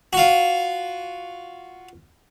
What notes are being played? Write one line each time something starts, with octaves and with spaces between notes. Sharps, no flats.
F4 F#4